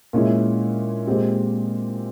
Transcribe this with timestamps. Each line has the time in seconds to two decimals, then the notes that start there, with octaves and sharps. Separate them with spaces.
0.13 A#2 G#3 C#4 E4
1.07 A#2 G#3 C4 G4